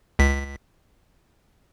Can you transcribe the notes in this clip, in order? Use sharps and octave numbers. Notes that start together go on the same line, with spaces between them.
C#2 B6